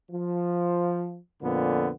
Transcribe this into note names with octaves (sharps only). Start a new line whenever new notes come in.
F3
F2 A#2 D3 B3